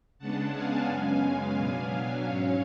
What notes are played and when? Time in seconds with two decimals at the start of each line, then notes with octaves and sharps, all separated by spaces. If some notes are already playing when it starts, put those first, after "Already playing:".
0.18 C#3 G#3 B3 D4 F#5 A5
0.53 F5 G#5
0.87 F#2 C#3 G#3 B3
1.55 B2 F#3 B3 D4
2.22 G#2 F#3 C#4 C#5 F5